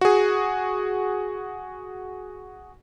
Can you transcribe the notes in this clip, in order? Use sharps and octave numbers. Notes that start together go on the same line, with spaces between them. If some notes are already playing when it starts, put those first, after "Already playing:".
F#4 G#4